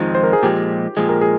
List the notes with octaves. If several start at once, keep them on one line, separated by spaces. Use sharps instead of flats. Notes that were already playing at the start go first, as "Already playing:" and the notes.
Already playing: F2 D#3 G#3 C4 D#4 F4
C5
A#4
G#4
A#2 F3 G#3 G4
A#2 F3 G#3 G#4
A#4
G#4